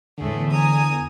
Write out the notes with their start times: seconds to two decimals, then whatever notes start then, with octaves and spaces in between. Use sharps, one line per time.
0.18 E2 A2 D3 A3 G#4
0.49 G#5 A#5 D#6